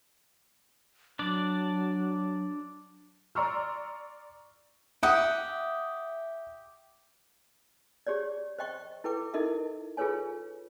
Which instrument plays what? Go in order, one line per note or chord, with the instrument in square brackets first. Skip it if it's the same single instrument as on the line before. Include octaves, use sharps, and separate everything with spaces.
[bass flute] F#3 [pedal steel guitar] D4 D5
[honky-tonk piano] D5 A#5 C6 C#6 E6 F6
[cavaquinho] G4 F#5 [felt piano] E5 D#6
[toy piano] G4 G#4 C#5 D5
C5 D#5 G5 C#6
E4 A4 B4 G5 D6
D#4 E4 A4 A#4 D#5 E5
F4 G#4 A4 B4 C#5 G#5